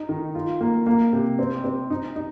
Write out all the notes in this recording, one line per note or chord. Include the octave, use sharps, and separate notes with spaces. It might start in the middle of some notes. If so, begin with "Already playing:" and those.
Already playing: D#4
D#3
F4
A#3
A#3
C3
C4
C4
D#4
D#4